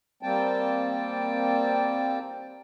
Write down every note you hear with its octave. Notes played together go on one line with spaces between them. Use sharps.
G3 A#3 C4 G5 A5